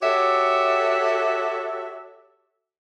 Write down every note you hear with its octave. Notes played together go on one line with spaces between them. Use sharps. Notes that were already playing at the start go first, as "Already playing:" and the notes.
F#4 G4 A4 C#5 E5